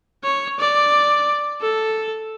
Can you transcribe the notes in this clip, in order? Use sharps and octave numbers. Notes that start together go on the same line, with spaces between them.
C#5
D5
A4